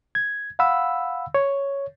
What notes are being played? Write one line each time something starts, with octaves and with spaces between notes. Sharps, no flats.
G#6
F5 F#5 B5 E6
C#5